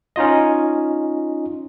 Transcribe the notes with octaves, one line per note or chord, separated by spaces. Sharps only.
C#4 D#4 F4 D#5